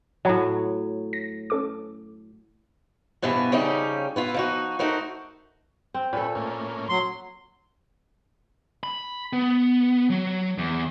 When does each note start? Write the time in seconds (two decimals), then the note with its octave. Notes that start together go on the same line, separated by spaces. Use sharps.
0.25 A2 F#3 C#5 F#5 A#5
1.13 A#6
1.50 C#4 A4 D6
3.22 G2 B2 E3 F3 B3
3.52 C#3 F3 G3 C#4 D#4 G4
4.16 B3 E4 F4
4.34 F3 D#4 F#4
4.79 A3 D#4 F#4 A#4 C5
5.94 C4
6.13 A#2 C#4 A4 B4
6.35 A2 A#3 C#4
6.89 F#3 C6
8.83 B5
9.33 B3
10.10 F#3
10.58 E2